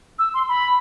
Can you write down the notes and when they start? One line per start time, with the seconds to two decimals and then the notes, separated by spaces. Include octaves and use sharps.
0.19 E6
0.34 C6
0.49 B5